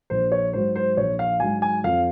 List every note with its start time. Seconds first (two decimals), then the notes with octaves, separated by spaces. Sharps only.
0.10 A#1 C5
0.32 C#5
0.53 G#2 F#3 C5
0.76 C5
0.97 A#1 C#5
1.19 F5
1.40 G#2 F#3 G#5
1.62 G#5
1.84 F2 F5